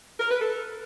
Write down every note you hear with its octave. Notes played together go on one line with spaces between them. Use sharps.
A#4
B4
A4